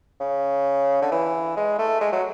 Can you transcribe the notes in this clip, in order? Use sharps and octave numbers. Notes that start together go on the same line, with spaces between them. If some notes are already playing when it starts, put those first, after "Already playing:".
C#3
D3
E3
G#3
A3
G#3
F#3